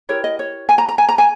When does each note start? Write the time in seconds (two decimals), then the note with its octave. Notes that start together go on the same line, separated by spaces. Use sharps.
0.09 E4 G4 A#4 C#5
0.24 D#5
0.39 C#5
0.69 G#5
0.78 A#5
0.89 A#5
0.98 G#5
1.09 A#5
1.18 G#5